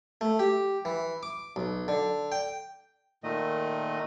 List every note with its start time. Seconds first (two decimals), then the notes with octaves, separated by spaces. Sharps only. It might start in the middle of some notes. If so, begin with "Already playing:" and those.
0.21 A3
0.39 G4
0.85 E3
1.23 D6
1.56 B1
1.88 D3
2.32 G5
3.24 A#2 D#3 A3 D#5